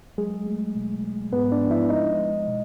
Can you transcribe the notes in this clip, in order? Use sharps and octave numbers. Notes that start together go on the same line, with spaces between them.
F#3 G#3 G#4
A3
B2
G#3
G#2 B3 B4
D4 D5
F3
E4 E5
G#3 D#4 D#5
G#3
B2